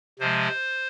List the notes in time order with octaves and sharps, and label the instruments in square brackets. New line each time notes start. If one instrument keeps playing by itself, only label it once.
[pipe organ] C3 F3 G#3 C5